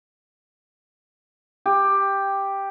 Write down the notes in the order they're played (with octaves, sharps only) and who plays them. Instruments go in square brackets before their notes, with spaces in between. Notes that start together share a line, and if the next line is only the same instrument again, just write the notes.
[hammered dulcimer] G4